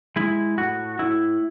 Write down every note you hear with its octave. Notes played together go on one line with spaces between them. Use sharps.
G#3 E4
A2 F#4
A2 E4